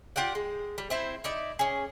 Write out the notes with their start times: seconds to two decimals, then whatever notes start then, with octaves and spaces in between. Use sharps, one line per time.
0.16 F4 G4 D5 F#5
0.35 G#3
0.78 G3
0.90 C4 E4 C5
1.24 D#4 E4 D5
1.59 C#4 G#4